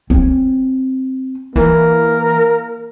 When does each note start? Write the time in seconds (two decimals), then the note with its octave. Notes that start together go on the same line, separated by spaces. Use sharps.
0.10 C4 C#4
1.56 E3 A#3 C#4 A#4